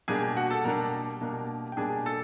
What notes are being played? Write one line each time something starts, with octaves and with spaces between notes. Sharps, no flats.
B2 G3 A#3 D4 G#4 G#5
F#4 F#5
A4 A5
B2 G3 A#3 D4 A#4 A#5
B2 G3 A#3 D4
G5
B2 G3 A#3 D4 G#4 G#5
A4 A5